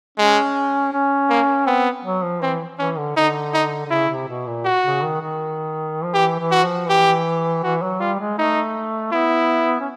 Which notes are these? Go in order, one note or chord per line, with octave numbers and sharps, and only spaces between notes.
G#3 C#4
C#4
A#3
B3 C4
F#3
F3
E3 C4
E3 C#4
D3
D3 D#4
D#4
D3
C#3 E4
C3
B2
A#2
F#4
C#3
D#3
D#3
F3
E3 G4
E3
F#4
F3
E3 G4
E3 F#4
F#3
G3 F4
G#3
A3 D#4
B3 E4
C#4